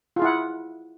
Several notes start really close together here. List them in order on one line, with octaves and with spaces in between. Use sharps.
F4 G#4 E4 F#5